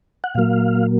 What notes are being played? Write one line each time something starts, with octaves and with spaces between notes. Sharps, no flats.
F#5
A#2 F#3 A#3 F5